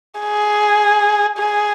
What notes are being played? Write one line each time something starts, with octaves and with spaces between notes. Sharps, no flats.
G#4
G#4